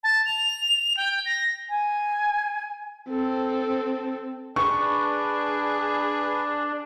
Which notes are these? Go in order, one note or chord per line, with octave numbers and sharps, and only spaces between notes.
A5
F7
G5
A#6
G#5
C4 A4
D4 G#4 B4 C#6